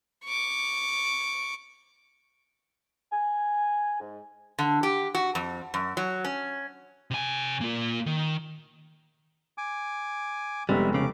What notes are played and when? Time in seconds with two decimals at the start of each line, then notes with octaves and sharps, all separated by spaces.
0.25 C#6 D6
3.12 G#5
4.00 G#2
4.59 D3
4.83 G4
5.15 F#4
5.35 F2
5.74 F#2
5.97 F#3
6.25 C#4
7.11 C3 G#5
7.61 A#3 F4
8.06 D#3
9.58 G#5 D6
10.69 F1 G3 G#3 B3 E5
10.94 C#3 D6